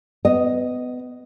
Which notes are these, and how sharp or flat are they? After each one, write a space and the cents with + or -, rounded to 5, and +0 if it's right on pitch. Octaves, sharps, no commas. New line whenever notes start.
B3 +20 D#5 +0